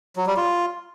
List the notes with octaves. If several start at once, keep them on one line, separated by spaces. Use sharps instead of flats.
F#3
G3
F4